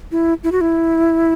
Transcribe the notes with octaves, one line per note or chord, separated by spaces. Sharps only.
E4
E4
F#4
E4